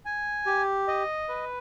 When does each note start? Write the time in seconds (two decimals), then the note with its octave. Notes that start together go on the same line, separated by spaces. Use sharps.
0.05 G#5
0.46 G4
0.88 D#5
1.29 B4